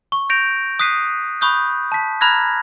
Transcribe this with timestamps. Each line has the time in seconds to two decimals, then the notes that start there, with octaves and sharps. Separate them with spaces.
0.12 C#6
0.30 G6 A#6 D7 F7
0.79 D#6 F#6 B6 C7 D#7
1.41 B5 C#6 D#6 F#6 G6
1.92 A5 B6
2.21 A#5 B5 F6 F#6 G#6 A#6